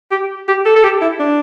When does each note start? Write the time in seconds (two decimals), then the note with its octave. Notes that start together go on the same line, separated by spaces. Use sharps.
0.11 G4
0.48 G4
0.66 A4
0.76 A4
0.84 G4
1.02 E4
1.20 D4